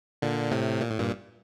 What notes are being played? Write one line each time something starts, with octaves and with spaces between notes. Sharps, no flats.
A#2 D3
A2 C3
A#2
A2
G2 A#2